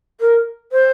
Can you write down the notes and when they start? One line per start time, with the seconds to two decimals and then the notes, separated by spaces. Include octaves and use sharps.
0.20 A#4
0.72 C5